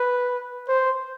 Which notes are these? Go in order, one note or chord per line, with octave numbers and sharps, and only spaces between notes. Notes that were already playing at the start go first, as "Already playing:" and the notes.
Already playing: B4
C5